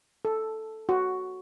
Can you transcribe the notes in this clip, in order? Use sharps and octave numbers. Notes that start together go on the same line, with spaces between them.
A4
F#4